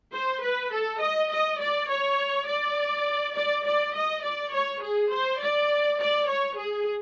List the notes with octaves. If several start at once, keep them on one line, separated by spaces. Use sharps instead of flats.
C5
B4
A4
D#5
D#5
D5
C#5
D5
D5
D5
D#5
D5
C#5
G#4
C5
D5
D5
C#5
G#4